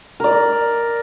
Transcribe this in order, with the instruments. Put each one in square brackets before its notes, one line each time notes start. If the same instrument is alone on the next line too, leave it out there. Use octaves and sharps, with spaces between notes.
[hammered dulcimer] A#4 D5